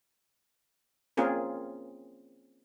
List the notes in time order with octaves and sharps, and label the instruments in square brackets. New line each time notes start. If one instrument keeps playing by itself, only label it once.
[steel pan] A#3 C4 C#4 F4 G#4 A#4